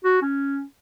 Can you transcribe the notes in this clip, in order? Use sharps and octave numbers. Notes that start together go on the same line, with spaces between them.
F#4
C#4